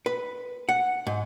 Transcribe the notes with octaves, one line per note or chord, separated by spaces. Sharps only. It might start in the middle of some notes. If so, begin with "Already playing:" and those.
B4
F#5
G#2